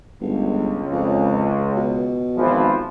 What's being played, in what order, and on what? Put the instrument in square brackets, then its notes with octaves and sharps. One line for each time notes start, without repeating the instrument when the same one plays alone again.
[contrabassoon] G1 [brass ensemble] C#2
[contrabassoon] F2
B2
[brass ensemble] G#1 E3 F3